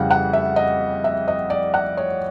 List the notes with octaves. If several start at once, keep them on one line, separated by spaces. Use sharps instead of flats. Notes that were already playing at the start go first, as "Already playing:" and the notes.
Already playing: F2 C#3 E3 G3 F5 F#5
F#5
E5
D#5
E5
D#5
D5
F#5
C#5